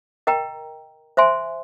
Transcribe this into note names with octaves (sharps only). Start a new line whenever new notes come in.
A#4 D#5 G5 A#5
C5 E5 G#5 C6